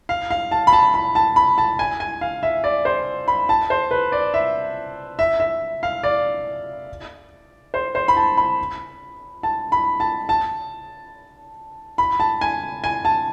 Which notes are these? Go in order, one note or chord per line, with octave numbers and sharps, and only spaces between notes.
F5
F5
A5
B5
A5
B5
A5
B5
A5
G#5
G#5
F5
E5
D5
C5
B5
A5
C5
B4
D5
E5
E5
E5
F5
D5
C5
C5
B5
A5
B5
A5
B5
A5
A5
B5
A5
G#5
G#5
A5